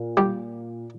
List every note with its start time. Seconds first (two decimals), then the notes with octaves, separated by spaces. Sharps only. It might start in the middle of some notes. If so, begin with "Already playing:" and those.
Already playing: A#2
0.17 G3 G4